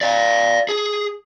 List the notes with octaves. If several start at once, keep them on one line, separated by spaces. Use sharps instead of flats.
D5 F5
G#4